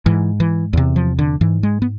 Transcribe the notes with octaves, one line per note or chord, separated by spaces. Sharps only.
G#2 E3
E3
E2 C3
F3
D3
G#2 E3
G#3
B3